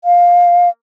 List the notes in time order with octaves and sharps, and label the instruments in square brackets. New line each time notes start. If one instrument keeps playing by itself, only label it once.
[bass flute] F5